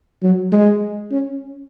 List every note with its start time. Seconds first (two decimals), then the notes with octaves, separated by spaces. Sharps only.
0.23 F#3
0.52 G#3
1.11 C#4